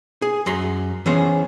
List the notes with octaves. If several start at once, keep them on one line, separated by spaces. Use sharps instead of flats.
G#4
F#2 A#5 C6
E3 B3 C#4 G#4 C5